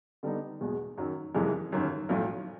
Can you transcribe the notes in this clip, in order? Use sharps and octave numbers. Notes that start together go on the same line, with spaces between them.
D3 G3 B3 D#4
E2 B2 G#3
F#2 D#3 F#3
F#1 F2 C3 E3 G#3
G1 F#2 D#3
B1 A2 F3